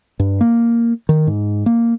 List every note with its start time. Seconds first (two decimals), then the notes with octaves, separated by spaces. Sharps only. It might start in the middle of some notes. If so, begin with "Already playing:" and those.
0.20 G2
0.41 A#3
1.09 D#3
1.27 G#2
1.66 A#3